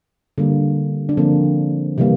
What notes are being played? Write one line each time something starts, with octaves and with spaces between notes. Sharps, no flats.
D3 G3 A#3
D4
D3 F3 A#3 C4
C3 E3 G3 A#3